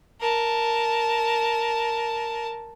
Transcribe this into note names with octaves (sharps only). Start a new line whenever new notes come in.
A#4 A5